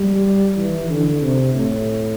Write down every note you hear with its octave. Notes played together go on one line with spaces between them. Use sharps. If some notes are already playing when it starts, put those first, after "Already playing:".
Already playing: G3
E3
D3
C3
A2